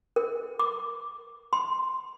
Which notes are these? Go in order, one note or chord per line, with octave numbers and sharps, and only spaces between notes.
A#4
D6
C6